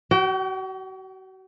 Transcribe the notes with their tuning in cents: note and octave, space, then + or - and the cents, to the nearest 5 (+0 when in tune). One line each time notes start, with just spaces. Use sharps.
F#4 +35 G5 -25